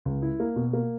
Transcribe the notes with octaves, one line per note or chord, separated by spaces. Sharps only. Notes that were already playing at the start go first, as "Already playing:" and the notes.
C#2
E4
A#3
B2
A#3